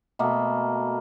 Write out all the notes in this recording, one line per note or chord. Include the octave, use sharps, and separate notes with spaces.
B2 A3 A#3